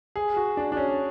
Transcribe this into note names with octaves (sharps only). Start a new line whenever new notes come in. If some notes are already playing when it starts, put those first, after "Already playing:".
G#4
F#4
D4
D4
C#4